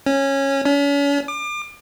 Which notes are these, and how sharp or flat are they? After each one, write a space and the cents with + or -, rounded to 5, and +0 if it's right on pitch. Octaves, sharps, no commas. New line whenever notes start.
C#4 -15
C#4 +40
D6 +35